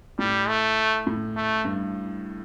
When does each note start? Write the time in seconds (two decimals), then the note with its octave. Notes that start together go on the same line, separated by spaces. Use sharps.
0.19 A2 G3
0.48 A3
1.07 A2
1.36 A3
1.65 G2